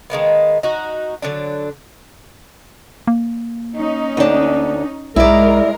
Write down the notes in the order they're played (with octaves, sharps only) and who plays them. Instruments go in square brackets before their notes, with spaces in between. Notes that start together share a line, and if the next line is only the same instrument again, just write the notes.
[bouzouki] D#3 G#3 A#3 B3
D#4 F#4
D3 F#3 D4
[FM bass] A#3
[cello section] C#4 D#4
[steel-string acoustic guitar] D2 D4
[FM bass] B1 [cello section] G#2 G#3 A#4 [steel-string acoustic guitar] E4 D5